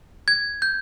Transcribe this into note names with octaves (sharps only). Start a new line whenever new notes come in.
G#6
G6